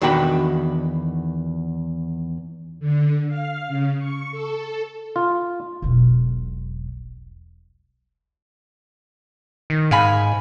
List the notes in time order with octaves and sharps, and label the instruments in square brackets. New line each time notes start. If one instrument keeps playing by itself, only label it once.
[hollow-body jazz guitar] E2 D#3 D4 F#4 G5 B5
[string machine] D3
F5
C#3
C#6
A4
[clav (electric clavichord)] F4
[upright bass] E1 B1
[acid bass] D#3
[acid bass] G#2 [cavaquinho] F5 G#5 B5